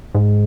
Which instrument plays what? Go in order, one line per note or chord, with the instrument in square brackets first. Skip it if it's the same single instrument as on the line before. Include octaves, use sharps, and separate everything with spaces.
[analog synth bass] G#2